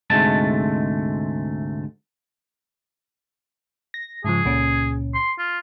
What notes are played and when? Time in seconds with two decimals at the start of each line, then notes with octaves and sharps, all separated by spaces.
0.10 D2 G#2 C3 G#3 A3 A5
3.94 A#6
4.24 G#2 C#3 F3 G#4
4.45 C#2 A#2 C#4
5.14 C6
5.38 F4